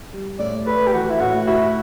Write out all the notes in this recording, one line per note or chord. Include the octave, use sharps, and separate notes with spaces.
G3
A2 D5
A3 B4
G4
E3 F#4
E4
A2 F#4
E4 F#4